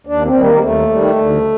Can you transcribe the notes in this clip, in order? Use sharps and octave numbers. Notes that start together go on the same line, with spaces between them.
D#2 D4
C4
D#3 G3
A#3
G3
D#2 A3
D#3 G3
D2